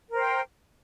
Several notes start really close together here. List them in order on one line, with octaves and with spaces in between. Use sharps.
A#4 C5 G5